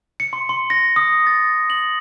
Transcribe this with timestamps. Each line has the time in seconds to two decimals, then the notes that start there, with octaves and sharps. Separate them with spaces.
0.20 C#7
0.33 C6
0.49 C6
0.70 A#6
0.96 D#6
1.27 A6
1.70 F#7